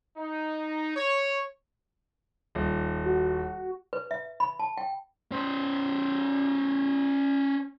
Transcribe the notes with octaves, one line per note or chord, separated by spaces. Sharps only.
D#4
C#5
D#1
F#4
B4
E5
B5
A5
G5
C#4 C5